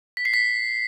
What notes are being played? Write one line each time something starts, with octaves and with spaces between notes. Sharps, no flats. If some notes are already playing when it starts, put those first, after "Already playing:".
B6
C7
B6